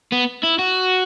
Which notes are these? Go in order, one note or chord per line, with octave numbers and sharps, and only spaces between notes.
B3
E4
F#4